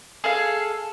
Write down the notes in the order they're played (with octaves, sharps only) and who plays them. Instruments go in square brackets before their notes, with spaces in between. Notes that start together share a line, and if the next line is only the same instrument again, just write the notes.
[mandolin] G#4 A4 F5